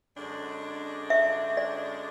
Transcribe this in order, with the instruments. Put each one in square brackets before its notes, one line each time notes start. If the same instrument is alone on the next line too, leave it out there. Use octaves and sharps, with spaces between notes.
[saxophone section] F#2 D3 G#3 D4
[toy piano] E5
D5